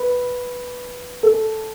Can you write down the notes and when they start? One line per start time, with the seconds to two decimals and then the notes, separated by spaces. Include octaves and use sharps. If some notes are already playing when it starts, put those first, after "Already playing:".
Already playing: B4
1.23 A4